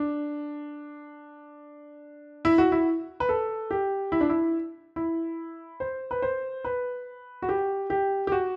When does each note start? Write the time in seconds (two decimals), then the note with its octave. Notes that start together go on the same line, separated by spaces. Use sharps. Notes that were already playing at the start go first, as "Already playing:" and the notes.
Already playing: D4
2.45 E4
2.58 F#4
2.72 E4
3.20 B4
3.29 A4
3.71 G4
4.12 E4
4.21 D4
4.29 E4
4.96 E4
5.80 C5
6.11 B4
6.22 C5
6.65 B4
7.42 F#4
7.49 G4
7.90 G4
8.27 G4
8.32 F#4